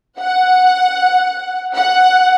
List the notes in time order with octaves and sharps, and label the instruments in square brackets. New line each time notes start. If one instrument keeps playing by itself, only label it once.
[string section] F#5
F#5